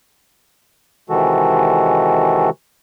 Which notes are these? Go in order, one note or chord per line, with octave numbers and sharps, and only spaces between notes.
C3 D#3 E3 G#3 F#4 A4